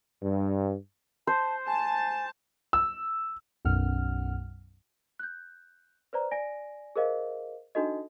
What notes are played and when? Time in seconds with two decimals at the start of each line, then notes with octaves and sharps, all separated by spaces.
0.22 G2
1.27 C5 A5
1.67 G#5 A5
2.73 E6
3.65 B1 F#2 F#5 F6
5.19 F#6 G6
6.13 B4 C5 D5 A#5
6.31 D5 G#5 A#6 D7
6.96 G#4 A#4 C5 D#5 F5
7.75 D4 D#4 F#4 A4 D#5